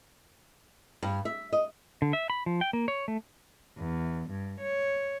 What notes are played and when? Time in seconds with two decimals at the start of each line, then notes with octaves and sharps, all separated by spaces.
1.03 G2
1.25 E5
1.53 D#5
2.02 D3
2.13 E5
2.30 B5
2.46 F3
2.61 G5
2.73 A#3
2.88 C#5
3.08 A3
3.79 E2
4.31 G2
4.61 C#5